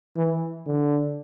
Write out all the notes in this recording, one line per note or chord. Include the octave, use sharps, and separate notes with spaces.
E3
D3